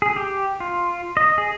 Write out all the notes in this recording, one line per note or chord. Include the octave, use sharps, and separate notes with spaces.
G#4
G4
F4
D#5
G#4